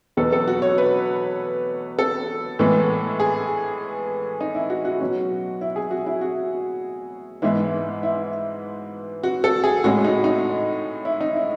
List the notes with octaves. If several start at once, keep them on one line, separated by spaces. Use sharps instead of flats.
E2 B2 F#3 B3 A4
A4
F#4
C#5
B4
A4
A2 E3 G#3 B3
G#4
D#4
E4
F#4
F#4
B2 F#3 C#4
E4
G#4
F#4
E4
F#4
G#2 E3 G#3 B3 E4
E4
F#4
A4
G#4
A2 G#3 C#4 F#4
D#4
D#4
E4
D#4
E4